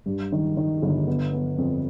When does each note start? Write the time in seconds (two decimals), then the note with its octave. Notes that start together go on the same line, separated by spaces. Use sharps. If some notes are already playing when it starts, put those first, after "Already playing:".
0.06 G2
0.32 D#3
0.57 D#3
0.82 G1
1.07 B3
1.33 B3
1.58 F2